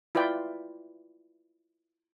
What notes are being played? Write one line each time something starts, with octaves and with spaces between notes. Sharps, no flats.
E4 F4 B4 D5 G5